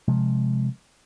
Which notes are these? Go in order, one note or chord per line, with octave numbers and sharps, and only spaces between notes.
C3 F3 G#3